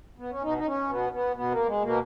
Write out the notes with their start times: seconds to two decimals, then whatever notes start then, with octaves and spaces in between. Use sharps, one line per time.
0.18 B3
0.30 C#4
0.43 B2 D#4
0.58 D#4
0.66 C#4
0.89 B2 B3
1.13 B3
1.36 B2 B3
1.51 A#3
1.66 G#3
1.83 B2 A#3